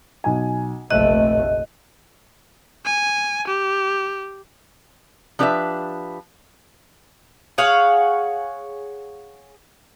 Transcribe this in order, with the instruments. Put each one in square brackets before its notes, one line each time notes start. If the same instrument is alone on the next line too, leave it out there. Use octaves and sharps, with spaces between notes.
[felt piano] B1 G#5
[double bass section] F1 A#1 A3 [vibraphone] D#5 [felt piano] E5 F#6
[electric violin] G#5
G4
[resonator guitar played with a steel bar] F3 D4 G4 B4 C#5 E5
[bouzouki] G#4 C#5 F5 F#5